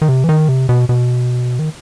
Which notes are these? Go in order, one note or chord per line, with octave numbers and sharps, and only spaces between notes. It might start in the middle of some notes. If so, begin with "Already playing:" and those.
D#3
C3
E3
D#3
C3
B2
B2
D#3